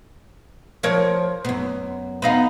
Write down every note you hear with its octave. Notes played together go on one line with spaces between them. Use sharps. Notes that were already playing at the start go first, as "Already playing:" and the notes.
F3 A#4 C#5
F#2 B3
B3 D#4 F5